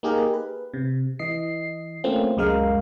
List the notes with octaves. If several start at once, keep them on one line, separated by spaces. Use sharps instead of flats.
A#3 D#4 G4 G#4 A#4
B4
C3
E3 D#5 C7
A3 A#3 C4 C#4 F4
C#2 F#2 G#3 A#4 F5